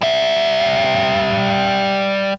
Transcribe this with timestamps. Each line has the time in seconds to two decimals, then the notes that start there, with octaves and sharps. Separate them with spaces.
0.02 G3 E5